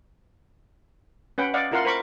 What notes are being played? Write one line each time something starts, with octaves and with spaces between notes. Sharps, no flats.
C#4 B4 F#5 G5
D5 D#5 F5 F#5
E4 F4 A#4 F5 F#5 C6
A#4 C5 B5 C#6 D6